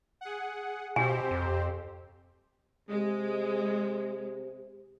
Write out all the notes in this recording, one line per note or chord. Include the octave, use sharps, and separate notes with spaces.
G#4 F#5
B2 C4 G4 C5 G#5
F2
C3 G#3